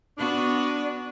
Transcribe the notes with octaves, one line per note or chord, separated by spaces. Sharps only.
B3 D4 F#4